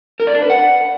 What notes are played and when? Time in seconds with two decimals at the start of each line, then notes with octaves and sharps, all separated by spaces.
0.20 A#4
0.27 D5
0.35 D4
0.42 B4
0.50 F#5